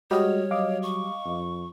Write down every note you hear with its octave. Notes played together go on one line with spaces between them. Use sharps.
G3 G#3 F#4 C#5 D#5 F6
F#3 D#5 F5 D6
C#6
F2